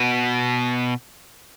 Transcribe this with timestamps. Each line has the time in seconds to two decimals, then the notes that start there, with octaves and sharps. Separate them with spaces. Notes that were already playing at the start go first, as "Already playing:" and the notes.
Already playing: B2